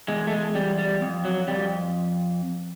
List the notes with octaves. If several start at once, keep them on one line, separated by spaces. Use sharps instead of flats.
E2 G#3
A3
G#3
E2 G3
G3
F2
F#3
F2 G3